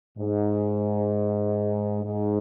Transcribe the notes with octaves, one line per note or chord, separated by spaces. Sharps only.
G#2
G#2